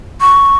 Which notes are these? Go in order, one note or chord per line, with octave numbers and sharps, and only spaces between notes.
C#6